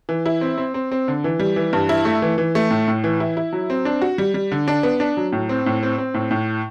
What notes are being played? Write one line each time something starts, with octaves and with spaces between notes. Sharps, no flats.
E3
E4
C4
C4
C4
C4
D3
E3
G3
E3
G2
E4
A3
E3
E3
A3
A2
A2
E3
E4
E4
F#3
C4
D4
F#4
G3
G3
D3
D4
B3
D4
F#3
A2
C4
A2
C4
C4
A2
A2